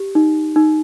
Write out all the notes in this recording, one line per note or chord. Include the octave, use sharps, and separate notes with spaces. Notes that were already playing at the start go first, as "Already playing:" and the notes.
Already playing: G4
D#4
D#4